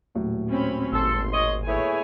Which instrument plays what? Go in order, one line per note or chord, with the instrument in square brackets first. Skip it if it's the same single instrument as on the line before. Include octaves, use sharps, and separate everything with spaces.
[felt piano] D#1 A2 F#3
[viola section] C4 C#4 B5
[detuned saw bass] G#1 [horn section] A4 [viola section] C6
[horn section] C#5 D#5
[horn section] A3 B3 E4 [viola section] G#4 C#5 G#5